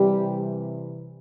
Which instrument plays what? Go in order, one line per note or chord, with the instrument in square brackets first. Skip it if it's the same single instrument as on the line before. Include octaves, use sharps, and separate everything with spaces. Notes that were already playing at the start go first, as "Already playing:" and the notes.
Already playing: [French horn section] C3 E3 G3 G4